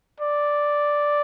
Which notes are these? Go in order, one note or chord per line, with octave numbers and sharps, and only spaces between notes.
D5